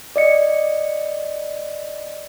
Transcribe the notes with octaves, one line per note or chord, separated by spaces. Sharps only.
D5 D#5 C#7